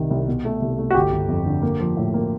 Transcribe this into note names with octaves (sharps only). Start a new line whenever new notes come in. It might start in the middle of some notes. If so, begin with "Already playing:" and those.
Already playing: C2 C3 D#3
C2
B2
A3
C2
A3
F#4
G1 G4
G1
F2
D3
A#3
F3
A2
A#3